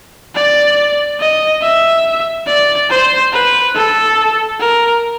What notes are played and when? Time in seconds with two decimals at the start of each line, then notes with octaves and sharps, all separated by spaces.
0.35 D5
1.20 D#5
1.62 E5
2.47 D5
2.90 C5
3.32 B4
3.75 A4
4.60 A#4